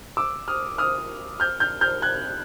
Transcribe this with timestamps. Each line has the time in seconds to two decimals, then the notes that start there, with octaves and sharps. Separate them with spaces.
0.17 D6 E6
0.48 D#6 F6
0.78 D#6 F6
1.40 F6 G6
1.60 F6 G6
1.81 F6 G6
2.02 F#6 G#6